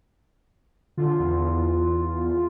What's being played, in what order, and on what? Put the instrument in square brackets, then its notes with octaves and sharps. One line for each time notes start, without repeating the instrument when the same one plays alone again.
[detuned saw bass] D3 [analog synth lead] F4
[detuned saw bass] E2